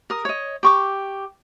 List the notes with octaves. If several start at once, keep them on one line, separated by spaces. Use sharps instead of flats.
A#4 D#6
C#5 D#5
G4 C#6 D6